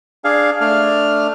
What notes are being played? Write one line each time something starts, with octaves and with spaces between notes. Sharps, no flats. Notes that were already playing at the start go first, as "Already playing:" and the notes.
D4 G#4 F5
A3 D4 F6